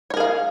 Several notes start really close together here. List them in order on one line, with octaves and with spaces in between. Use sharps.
C#5 A#4 G#4 F5